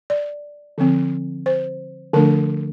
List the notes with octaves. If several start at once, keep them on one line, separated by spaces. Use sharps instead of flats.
D5
D3 F3 C4
C5
D3 F3 A3 D4 A#4